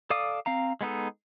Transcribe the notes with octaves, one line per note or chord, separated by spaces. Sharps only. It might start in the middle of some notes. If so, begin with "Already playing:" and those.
A4 D5 F5 D6 D#6
C4 F5 A#5
G#3 B3 D#4 A4